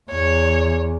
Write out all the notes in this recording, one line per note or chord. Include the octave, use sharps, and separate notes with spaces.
E2 C#5